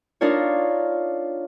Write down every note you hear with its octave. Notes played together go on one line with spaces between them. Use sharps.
D4 D#4 F4 A#4 C#5